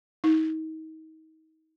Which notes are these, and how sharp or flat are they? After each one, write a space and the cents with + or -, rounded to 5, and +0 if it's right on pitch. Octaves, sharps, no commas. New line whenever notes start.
D#4 +35